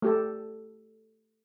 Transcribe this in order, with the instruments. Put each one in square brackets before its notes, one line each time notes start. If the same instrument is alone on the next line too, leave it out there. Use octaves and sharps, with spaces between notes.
[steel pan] A3 G4 A4